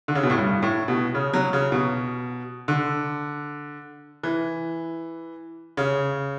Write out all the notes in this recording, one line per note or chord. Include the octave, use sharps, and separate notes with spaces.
D3
C#3
B2
A2
G2
A2
B2
C#3
F#3
C#3
B2
D3
E3
C#3